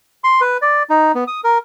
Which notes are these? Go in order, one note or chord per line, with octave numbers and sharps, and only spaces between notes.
C6
B4
D5
D#4
B3
D#6
A#4